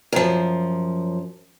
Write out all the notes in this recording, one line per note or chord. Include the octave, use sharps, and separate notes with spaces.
F#2 F3